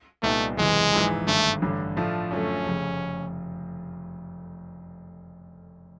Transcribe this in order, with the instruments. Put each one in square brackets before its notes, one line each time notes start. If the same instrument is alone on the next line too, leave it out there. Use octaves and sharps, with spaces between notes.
[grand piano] C2 A#2 G3 B3 D#4 [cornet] A3
[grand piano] F#1 E2 C3 E3 [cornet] G#3
[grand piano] A#1 G#2 E3
[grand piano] G#1 G2 D3 [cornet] A3
[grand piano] A1 G2 D3
A2 F3 A3 D4 F4
[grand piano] F#2 D3 F3 A3 [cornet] C#4
[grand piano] F1 F2 C#3